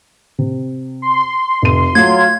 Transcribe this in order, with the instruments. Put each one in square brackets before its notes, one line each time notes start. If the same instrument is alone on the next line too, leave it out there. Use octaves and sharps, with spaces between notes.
[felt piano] C3
[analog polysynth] C6
[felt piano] F1 D#7
[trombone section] F#3 F4 [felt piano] A3 [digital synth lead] G#6